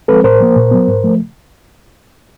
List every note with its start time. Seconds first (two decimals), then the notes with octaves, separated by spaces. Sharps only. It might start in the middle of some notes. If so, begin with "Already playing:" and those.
0.08 F3 G#3 C4 A4 B4
0.24 A2 A#4 C5
0.40 F3 A#3
0.56 A#2
0.71 F#3 B3
0.88 G#2
1.04 F3 A3